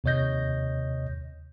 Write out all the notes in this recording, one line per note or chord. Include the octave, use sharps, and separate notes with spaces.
D#2 C3 C#5 D#5 G6 A#6